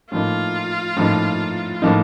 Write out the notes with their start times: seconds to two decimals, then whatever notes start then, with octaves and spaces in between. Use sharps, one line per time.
0.12 A2 F3 A#3 D#4 F4
0.97 A2 F3 A#3 D#4
1.82 A2 F3 A#3 D#4